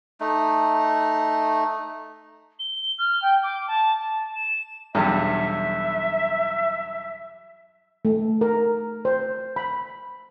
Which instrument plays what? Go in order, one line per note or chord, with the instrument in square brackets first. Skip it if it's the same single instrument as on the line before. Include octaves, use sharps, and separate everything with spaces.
[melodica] A3 D#4
[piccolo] G7
F6
G5
D6
A5
A5
E7
[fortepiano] B1 E2 G2 [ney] E5
[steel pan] A3
A#4
C5
B5